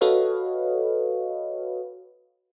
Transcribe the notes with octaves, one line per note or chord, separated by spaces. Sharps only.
F#4 A4 B4 C#5 D#5 F5